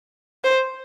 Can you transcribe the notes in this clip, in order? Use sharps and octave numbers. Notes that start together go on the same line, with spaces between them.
C5